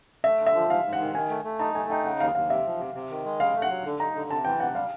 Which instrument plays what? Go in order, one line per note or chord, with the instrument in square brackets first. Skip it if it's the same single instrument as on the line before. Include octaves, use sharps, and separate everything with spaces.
[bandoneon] A3 [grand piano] E5
[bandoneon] D3
[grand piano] E5
[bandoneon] F3
[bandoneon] G#2 [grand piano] F5
[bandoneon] G#2
[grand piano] F#5
[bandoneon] D#3
[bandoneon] D#3 [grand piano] G#5
[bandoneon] A3
A3
[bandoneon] D#4 [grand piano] A5
[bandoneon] A3 [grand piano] G#5
[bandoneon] D#4 [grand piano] G5
[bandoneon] C#3 [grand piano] F#5
[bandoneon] D#2 [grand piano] F5
[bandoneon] D#2 [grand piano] F5
[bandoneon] C3 [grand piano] E5
[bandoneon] F3
C3
C3
D#3
G#3
[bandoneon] C#3 [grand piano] F5
[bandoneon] A3
[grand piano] F#5
[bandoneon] F#3
D3
[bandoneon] D#4 [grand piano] A#5
[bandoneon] D3
[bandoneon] C3 [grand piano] A5
[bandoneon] E3 [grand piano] G5
[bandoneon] C3 [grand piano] F#5
[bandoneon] G3 [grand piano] F5